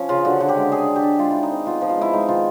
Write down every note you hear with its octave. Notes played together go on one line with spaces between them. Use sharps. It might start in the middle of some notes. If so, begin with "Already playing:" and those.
Already playing: F3 C#4
C#3 F4
D3 F#4
D3
G4
G#3
D3 G#4
D4
G4
D4
G#3 F4
D#3 E4
D#4
C4
B3 F4
F3
F4
G#3 E4
G#3 D#4
D#3 F4